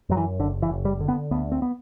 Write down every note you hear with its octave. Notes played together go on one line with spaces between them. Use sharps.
F#2 F#3
E3
F#1 D3
E3
F#1
G3
D3
B3
D2 B3
C4
B3